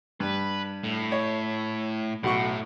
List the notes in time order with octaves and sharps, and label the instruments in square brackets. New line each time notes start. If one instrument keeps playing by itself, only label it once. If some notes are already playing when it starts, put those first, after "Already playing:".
[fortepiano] G2 [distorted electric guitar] B4
[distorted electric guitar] A2
[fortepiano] C#5
[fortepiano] B1 F#4 C#6 [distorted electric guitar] A2